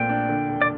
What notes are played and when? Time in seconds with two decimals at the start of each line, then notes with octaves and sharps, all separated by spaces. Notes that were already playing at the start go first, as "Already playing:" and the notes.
Already playing: A#1 A#2 A3 C4 G5
0.09 D4
0.29 D3
0.49 E1
0.62 D5